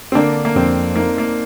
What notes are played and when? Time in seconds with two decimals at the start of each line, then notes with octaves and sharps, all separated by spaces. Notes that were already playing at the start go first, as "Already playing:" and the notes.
0.12 C4
0.15 D3 A#3 D4
0.45 A#3
0.55 F2 C4
0.95 A#3 D#4
1.18 A#3